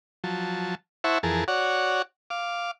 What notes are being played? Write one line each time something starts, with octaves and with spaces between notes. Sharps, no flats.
F3 F#3 A5
E4 C5 E5 F#5 A5 C#6
F2 E3 G#4 A#4 A5
F#4 C#5 D5 F#5
F5 D6